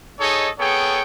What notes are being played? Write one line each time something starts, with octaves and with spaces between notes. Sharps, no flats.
D#4 G#4 A4 C#5 D#5
B3 G#4 A4 C#5 G5